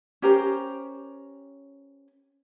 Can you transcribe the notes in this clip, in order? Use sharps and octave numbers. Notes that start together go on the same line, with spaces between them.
C#4 G4 A#4 C5